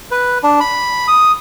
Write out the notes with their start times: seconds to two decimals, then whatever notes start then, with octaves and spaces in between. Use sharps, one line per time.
0.11 B4
0.43 D4
0.61 B5
1.08 D#6